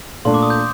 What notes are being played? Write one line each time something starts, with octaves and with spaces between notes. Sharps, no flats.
A#2 A3 D4 C6
D6
D#6
G6